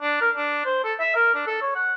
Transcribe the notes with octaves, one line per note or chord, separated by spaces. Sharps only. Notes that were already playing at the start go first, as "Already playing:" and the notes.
D4
A#4
D4
C5
A4
E5
A#4
D4
A4
C#5
F#5